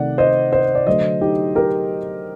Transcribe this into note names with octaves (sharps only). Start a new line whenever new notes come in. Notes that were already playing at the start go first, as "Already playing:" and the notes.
Already playing: C3 D#3 A3 D5 F#5
C5 D#5
C5 D#5
D5
D3 F#3 A3 C5 D#5
D#4 G4
G4 A#4